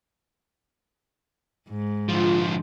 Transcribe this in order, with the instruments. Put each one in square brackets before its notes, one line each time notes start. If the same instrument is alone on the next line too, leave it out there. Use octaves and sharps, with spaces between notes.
[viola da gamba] G#2
[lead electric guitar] D3 F3 [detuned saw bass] F4